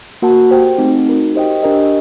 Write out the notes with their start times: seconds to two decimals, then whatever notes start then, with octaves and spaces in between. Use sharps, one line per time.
0.22 A#3 F#4 A#4 F#5 A5
0.51 G4 C5 G5
0.78 A3 C4 D#4
1.06 D#4 F#4 A#4
1.35 G4 C5 D#5 G5
1.63 D4 G4 A#4 D#5